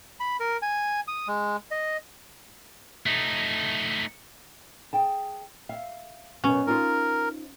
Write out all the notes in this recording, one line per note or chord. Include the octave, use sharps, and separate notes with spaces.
B5
A#4
G#5
D#6
G#3
D#5
A3 D#4
G#4 G5 A5
E5 F5
F#2 B2 B3 C#4
D#4 F4 A#4 C5